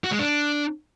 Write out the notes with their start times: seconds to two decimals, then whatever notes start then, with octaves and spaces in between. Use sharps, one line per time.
0.04 F#4
0.12 G#3
0.19 D4